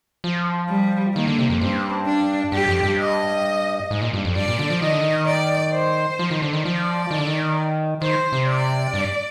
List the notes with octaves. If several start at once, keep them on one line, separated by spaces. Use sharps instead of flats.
F3
G3
D#3 A#3
D3
C3
F2
G2 C4
D4
G2 G4
F2
G2
D#5
G#2
A#2
G2
F2
G2 D5
A#2
D3
F3
D#3 D#5
D3
D#3
D5
C5
F3
D#3
D3
D#3
F3 D5
D#3
D3
D#3
D#3 C5
C3
D5
G2